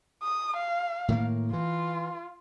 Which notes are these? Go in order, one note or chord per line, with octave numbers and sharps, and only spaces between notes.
D#6
F5
A2 D#3 A#3
E3 F4